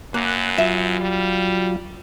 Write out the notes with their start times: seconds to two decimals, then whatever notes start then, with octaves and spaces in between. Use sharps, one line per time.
0.14 F#2 A#3 F#6
0.58 F#3 F4 E5
1.00 G3